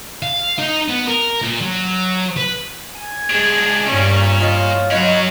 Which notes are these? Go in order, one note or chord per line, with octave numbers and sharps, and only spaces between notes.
F5
D#4
B3
A#4
A#2
F#3
B4
G#5
G#2 D4 G#4
G2 A#2 G3 C#4
F3 F4 C#5 D#5
F#3 C#4 D#4 F#4 A#4 B4